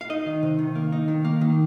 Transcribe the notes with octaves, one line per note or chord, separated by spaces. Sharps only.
F5
D#4 D#5
D#3
C3
D#3
A#3
D#4
D#3
A#3
D#3